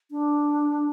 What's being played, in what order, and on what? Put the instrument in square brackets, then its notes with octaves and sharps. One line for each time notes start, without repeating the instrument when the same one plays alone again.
[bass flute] D4